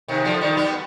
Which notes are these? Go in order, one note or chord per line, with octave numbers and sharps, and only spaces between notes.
C3 D#3
D3 F3
D#3 G3
G3 B3